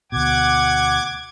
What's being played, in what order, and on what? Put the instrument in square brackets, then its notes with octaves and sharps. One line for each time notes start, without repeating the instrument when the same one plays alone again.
[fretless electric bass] D2 B2 [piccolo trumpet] F#5 [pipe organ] D6 G#6